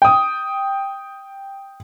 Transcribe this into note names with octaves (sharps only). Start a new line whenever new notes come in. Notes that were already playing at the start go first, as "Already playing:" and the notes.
G5 D#6